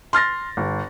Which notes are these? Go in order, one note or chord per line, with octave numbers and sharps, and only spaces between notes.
C6 F6 A6 A#6
G1